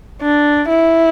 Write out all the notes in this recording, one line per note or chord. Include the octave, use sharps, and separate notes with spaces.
D4
E4